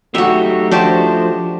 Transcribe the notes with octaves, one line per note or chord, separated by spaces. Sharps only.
F#3 A3 D#4 F#4 G4 E5
F3 D4 F#4 G4 C5